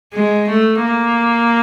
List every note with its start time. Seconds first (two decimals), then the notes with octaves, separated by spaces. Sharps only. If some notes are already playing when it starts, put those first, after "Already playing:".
0.14 G#3
0.49 A3
0.83 A#3